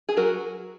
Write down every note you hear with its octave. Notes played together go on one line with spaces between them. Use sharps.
G#4
F#3 F#4 A#4